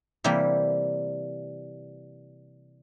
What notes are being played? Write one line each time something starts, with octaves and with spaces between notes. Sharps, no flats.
C3 E3 G3 A#3